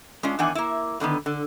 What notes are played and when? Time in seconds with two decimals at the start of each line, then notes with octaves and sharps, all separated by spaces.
0.23 G#3 C#4 D4 F4
0.39 E2 D#3 E3 D4 F#5 G#5
0.55 A#3 E4
1.00 A2 D3 D#3 B3
1.26 D3